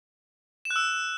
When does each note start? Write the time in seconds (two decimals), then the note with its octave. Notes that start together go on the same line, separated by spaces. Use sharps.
0.65 E7
0.71 F#6
0.76 E6